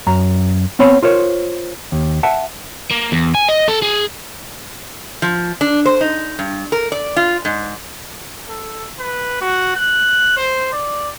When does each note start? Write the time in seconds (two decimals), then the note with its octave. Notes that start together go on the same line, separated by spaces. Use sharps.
0.07 F#2 A#5
0.79 B3 C4 C#5 B5
1.03 F4 A#4 C5 C#5
1.92 D#2
2.23 E5 F#5 A5
2.91 A#3
3.12 E2
3.35 G#5
3.49 D#5
3.68 A4
3.82 G#4
5.22 F3
5.61 D4
5.86 C5
6.01 D#4
6.39 G2
6.72 A#4
6.92 D5
7.16 F4
7.45 G#2
8.49 A4
8.99 B4
9.41 F#4
9.76 F#6
10.37 C5
10.72 D5